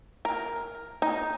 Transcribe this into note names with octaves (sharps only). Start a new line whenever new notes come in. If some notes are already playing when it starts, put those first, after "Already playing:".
A#4
D#4